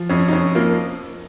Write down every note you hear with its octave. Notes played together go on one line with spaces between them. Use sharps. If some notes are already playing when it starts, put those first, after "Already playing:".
Already playing: F3
F2 C#4
D#4
F2 C#4
F3 A#3